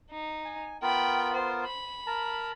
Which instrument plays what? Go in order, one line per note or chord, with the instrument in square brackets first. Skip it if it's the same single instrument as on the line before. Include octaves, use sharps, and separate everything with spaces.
[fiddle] D#4
[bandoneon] G#5
[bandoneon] B3 F4 A#4 [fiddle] G5 B5
[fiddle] C5
B5
[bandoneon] A#4 A5 A#5